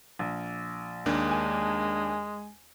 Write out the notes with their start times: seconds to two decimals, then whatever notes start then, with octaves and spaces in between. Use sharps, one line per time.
0.19 A#1
1.06 D#2 G#3 A#3 D4
1.31 G#5